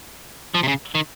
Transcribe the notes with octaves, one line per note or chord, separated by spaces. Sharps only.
F3
C3
C#3
D#3